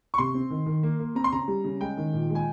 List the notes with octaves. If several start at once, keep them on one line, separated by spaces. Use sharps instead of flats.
C#6
C3 C6
C4
D#3
D#3
A#3
A#3
C4 A#5
C6
C#3 A#5
G3
C#3
G#3 G5
D#3
A#2
G#3
G#5